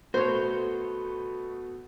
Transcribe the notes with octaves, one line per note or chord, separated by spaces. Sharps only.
B2 A3 B3 F#4 A4 C5 C#5